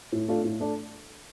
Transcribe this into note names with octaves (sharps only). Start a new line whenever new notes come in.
A2
A3 D4 F4
A2
A3 D4